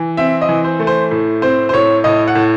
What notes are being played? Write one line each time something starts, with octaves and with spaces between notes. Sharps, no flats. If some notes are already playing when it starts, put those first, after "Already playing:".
Already playing: E3
C4 E5
D#5
E3
C5
A3
C5
A2
C4 C5
C5
A2 C#5
A2 D#5
F#5
A2